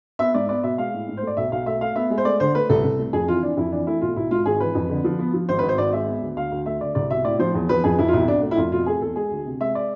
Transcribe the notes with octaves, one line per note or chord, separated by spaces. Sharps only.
B3 E5
G#2 D5
B3 D5
B2 E5
G#3 F5
A2
G#2
C5
A3
D5
B1 E5
B1 F5
A3 E5
A3 F5
B3 E5
G#3
C5
A3 D5
D3 C5
A3 B4
C2 A4
C2
A3
F2 G#4
E3 F4
E3 D4
F2 E4
E3 D4
A3 E4
B1 F4
B1 E4
G#2 F4
G#1 G#4
E3 B4
F2
D3
F3
B3
F3
G#1 C5
B4
G#1
C5
G#1 D5
G#3 E5
B3
D2
D2 F5
D2
A3 E5
D3 D5
C2 D5
B2 E5
A2 D5
F3 C5
E2
F3 B4
F2 G#4
F2 E4
F4
B1 E4
B1 D4
A3
E4
F2 F4
B2 F4
A3 G#4
E2 A4
G#3 G#4
D2
C3
G#3 E5
D5